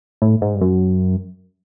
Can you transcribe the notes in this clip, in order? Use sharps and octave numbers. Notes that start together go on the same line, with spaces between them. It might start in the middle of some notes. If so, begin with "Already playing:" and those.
A2
G#2
G2
F#2